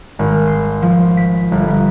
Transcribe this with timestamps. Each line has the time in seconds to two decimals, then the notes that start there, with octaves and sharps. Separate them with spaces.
0.19 G#1
0.47 C6
0.82 F3
1.17 B6
1.52 G1